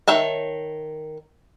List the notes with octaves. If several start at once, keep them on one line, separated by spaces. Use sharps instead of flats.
D#3 C#5 E5 A5